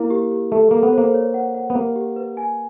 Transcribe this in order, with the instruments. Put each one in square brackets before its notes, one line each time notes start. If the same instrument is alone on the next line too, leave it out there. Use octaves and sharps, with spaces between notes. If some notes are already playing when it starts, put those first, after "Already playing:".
Already playing: [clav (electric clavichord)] A#3 [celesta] E4
[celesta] G4
G4
[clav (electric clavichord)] A3 [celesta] A4
[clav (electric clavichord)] A#3 [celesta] A4
[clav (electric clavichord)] B3
[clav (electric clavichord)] A#3 [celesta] C5
[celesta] C#5
F#5
F#5
[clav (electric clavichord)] B3
[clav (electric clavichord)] A#3 [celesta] G4
[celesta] G4
B4
G#5